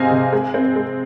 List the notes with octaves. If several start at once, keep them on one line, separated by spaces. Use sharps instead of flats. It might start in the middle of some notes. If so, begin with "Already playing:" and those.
Already playing: C3 G#3 C4 C5 D#5 F5 G#5
C3
G#3
C4
G#3